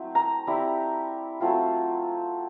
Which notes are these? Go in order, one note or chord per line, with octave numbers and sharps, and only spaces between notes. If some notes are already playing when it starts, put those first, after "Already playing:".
Already playing: F#3 A3 C4 E4
A#5
G3 C4 E4
F#3 A3 C4 F4